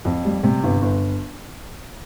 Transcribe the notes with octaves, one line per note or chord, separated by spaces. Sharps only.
F2
G3
C3
G1
G1